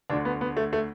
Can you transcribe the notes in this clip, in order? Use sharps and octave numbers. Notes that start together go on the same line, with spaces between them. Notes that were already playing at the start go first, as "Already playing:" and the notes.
D2 D3 D4
B3
B3
A3
A3